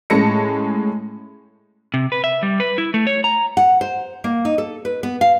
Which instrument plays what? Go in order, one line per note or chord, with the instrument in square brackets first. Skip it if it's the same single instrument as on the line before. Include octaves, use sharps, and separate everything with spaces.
[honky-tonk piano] A2 G#3 C#4 A5 A#6 C#7
[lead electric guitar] C3
B4
E5
G3
B4
E4
A3
C#5
A#5
[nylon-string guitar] F#5
C5
A#3
D#4
A4
B4
B3
F5